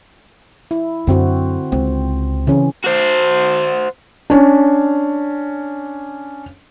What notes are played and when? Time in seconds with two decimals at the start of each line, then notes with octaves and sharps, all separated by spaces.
0.71 E4
1.07 F#2 D3 C4 F#4
1.72 C#2 C4
2.47 C#3 E3 C#4
2.84 F#4 C5
4.30 C#4 D4